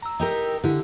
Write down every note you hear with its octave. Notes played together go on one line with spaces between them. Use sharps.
A#5 E6
D#4 G4 A#4
D3 E4 G4